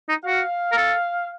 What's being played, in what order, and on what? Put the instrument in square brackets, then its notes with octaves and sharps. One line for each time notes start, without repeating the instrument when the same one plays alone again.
[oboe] D#4
[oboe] F#4 [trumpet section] F5
[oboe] A#4
A4